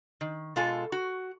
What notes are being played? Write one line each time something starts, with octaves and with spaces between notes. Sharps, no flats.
D#3
B2 G#3 F4 A4 G#5
F#4